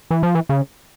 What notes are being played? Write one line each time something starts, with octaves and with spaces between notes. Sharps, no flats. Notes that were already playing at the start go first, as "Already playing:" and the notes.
E3
F3
E3
C#3